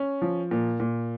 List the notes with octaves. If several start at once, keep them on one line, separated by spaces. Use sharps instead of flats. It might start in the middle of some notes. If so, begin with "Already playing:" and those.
Already playing: C#4
F3
A#2
A#2